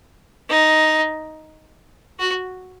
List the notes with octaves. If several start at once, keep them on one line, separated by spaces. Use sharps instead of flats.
D#4
F#4